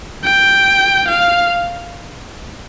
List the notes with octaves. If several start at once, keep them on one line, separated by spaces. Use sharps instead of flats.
G5
F5